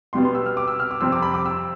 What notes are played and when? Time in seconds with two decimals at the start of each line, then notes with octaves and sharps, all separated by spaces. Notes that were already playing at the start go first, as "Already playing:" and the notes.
0.13 B2 G3 B3 C6
0.25 C6
0.35 E6
0.46 F6
0.57 D6
0.68 E6
0.80 F6
0.91 D6
1.01 F2 C3 G3 C4 E6
1.12 D6
1.22 B5
1.34 D6
1.46 E6